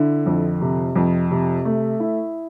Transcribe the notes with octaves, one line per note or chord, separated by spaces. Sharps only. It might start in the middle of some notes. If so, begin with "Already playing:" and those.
Already playing: D3 E4
F2
C3
F2
C3
A3
E4